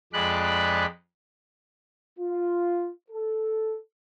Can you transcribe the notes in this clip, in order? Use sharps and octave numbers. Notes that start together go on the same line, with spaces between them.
F2 G#3 D5 B5 F#6
F4
A4